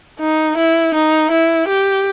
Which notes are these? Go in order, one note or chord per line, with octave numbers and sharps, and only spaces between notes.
D#4
E4
D#4
E4
G4